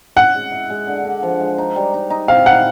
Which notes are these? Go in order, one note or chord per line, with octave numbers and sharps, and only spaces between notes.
C#4 F#5
G#3
E4
G#3
D3
D3
F3
G#3
D#4
G3
D#4
D#4
C4 F5
E4 F#5